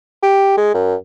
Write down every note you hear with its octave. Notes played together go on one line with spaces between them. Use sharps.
G4
G#3
F#2